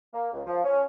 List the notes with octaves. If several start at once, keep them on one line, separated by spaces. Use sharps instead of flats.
A#3
C#2
F3
C#4